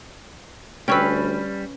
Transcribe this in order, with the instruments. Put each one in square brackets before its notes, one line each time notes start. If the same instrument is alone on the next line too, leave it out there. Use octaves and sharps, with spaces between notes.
[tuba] D2 [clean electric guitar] G3 [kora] C#4 B4 [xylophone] G5 C#6 E6